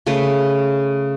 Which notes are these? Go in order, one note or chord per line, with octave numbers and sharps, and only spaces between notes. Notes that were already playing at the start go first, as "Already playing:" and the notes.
C#3 A3 B4